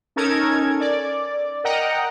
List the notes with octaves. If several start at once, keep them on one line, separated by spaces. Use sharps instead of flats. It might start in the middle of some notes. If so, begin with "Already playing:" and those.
C#4 D#4 A4 A#4 G#6
D5
A#4 D#5 F#5 G5 A#5